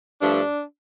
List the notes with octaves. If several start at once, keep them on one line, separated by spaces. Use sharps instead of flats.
G2 F3 A3 D4